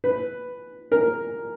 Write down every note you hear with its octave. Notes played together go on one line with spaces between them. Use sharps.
B4
A#4